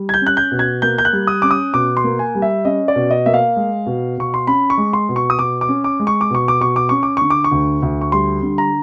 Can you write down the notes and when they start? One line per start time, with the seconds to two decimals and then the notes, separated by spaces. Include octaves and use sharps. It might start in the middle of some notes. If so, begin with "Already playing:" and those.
Already playing: G3
0.09 G#6
0.14 G6
0.21 C#4
0.26 F#6
0.37 G6
0.51 B2
0.59 G#6
0.82 A#3 G6
0.98 G6
1.05 F#6
1.13 G3
1.27 D#6
1.42 C#4 D6
1.51 D#6
1.74 B2 D6
1.97 C6
2.04 A#3
2.19 G#5
2.35 G3
2.42 E5
2.65 C#4 D#5
2.88 D5
2.96 B2
3.11 D#5
3.26 A#3 E5
3.34 F5
3.56 G#3
3.86 B2
4.17 B2 C#6
4.34 C6
4.47 C#4 B5
4.70 C#6
4.78 G#3
4.93 C6
5.09 B2
5.16 C#6
5.30 D#6
5.39 B2 D6
5.61 D6
5.69 C#4
5.84 D6
6.00 G#3
6.07 C#6
6.21 D6
6.31 B2 C#6
6.48 D6
6.61 B2 C#6
6.76 D6
6.89 C#4 C#6
7.03 D6
7.17 D3 C#6
7.30 D6
7.44 C#6
7.51 D2
7.82 D2
8.01 C#6
8.12 G3 C6
8.43 D3
8.58 A#5